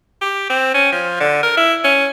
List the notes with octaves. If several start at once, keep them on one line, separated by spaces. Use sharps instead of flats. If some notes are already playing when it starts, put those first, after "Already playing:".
G4
C4
C#4
F3
D3
A#4
E4
C#4